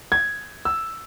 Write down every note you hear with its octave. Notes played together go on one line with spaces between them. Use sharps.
G#6
E6